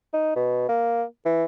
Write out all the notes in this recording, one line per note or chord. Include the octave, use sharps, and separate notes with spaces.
D#4
B2
A#3
E3